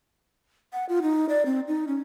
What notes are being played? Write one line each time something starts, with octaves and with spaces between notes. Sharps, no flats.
F#5
F4
D#4
D5
C4
D#4
C#4